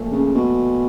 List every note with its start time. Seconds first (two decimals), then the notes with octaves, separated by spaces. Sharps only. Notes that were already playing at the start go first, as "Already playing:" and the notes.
Already playing: A#2 F3 A3
0.11 C#3
0.35 B2